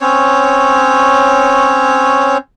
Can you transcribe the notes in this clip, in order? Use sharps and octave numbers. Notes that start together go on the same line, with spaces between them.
C4 C#4 C#5